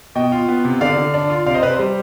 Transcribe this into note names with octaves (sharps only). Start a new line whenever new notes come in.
B2 D#5 G5
F4
B3
C3
D3 D5 F5
D3
D4
F4
C3 D5 F5
C5 D#5
C3 B4 D5
C5
G3